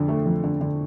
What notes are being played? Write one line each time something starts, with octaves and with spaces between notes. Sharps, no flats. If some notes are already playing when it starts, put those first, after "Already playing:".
Already playing: F2 D3
A3
F2
D3
D3